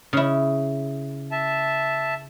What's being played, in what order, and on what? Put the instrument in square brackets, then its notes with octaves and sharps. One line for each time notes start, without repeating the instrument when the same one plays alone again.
[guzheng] C#3 E4
[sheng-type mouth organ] E5 A5